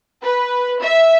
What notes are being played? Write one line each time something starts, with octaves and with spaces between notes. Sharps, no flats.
B4
E5